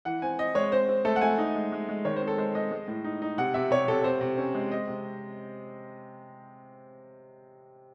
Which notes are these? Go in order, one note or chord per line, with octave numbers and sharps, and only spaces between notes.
E3 F#5
C4 G#5
C4 D#5
G#3 C#5
C4 C5
C4
A3 A4
F#5
A3 G#5
D#4
G#3
G#3
G#3
D#3 C#5
C5
C4
A4
G#3 C5
G#3 D#5
G#3
A2
D#4
D#4
C3 F#5
C3 E5
C3 C#5
C3 A4
C3 C5
C3
C#4
G#3
C4 D#5
C3